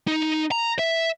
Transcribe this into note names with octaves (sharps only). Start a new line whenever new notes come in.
D#4
A#5
E5